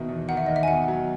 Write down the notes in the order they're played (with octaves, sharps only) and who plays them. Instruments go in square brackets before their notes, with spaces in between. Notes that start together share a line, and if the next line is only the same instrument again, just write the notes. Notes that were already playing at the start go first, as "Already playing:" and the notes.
Already playing: [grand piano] B2 D#3 [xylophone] E5
[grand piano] E2
[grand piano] D#3 [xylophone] F#5
[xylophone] E5
[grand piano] D#2 [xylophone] D#5
[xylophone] E5
G#5
[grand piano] B2 [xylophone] F#5
[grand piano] F#3